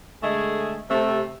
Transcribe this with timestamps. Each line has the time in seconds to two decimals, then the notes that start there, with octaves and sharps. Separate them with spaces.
0.22 D3 G#3 A3 G#4
0.89 C3 A3